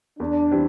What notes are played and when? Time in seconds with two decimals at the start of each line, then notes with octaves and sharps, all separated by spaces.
0.19 E2 D4
0.51 E3 G3 C4 G4